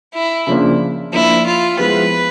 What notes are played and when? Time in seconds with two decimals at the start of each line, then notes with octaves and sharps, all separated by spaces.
0.14 E4
0.47 C#3 F3 A#3 D4
1.13 F3 A#3 D4 E4
1.46 F4
1.79 F3 G#3 B3 E4 B4